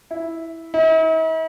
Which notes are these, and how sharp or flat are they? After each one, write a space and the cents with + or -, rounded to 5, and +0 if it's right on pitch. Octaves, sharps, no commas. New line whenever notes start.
E4 -5
E4 -45